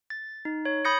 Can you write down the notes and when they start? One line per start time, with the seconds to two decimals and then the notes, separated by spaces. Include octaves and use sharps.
0.10 A6
0.45 D#4
0.65 C#5
0.85 B5 D#6 G6 A#6 C#7